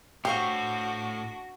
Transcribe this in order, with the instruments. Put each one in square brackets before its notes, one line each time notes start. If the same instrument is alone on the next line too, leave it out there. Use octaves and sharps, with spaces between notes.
[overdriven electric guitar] A2 [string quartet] D4 F#4 [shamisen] G4 [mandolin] C5 F5 C#6